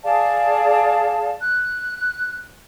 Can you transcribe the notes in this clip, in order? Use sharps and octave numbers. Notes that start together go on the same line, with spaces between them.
G#4 D5 F5 A5
F#6